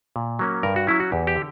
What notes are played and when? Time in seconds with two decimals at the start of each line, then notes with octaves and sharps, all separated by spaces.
0.16 A#2
0.39 F#3 A#3 C#4
0.63 G2 A#4
0.76 F#4
0.87 F#3 C#4 E4
1.00 F#4
1.12 E2 G4
1.27 G4
1.36 D3